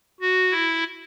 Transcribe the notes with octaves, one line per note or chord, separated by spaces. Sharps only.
F#4
E4